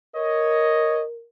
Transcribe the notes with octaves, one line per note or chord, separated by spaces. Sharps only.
A#4 C#5 D#5